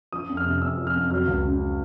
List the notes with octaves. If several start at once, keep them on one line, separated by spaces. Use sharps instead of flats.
F3 D#6
F2
F6
C3
F2 E6
F3
F6
F2
F#3 F6
C#2
C#3